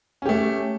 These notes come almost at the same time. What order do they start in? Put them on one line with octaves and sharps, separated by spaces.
C#4 G4 A3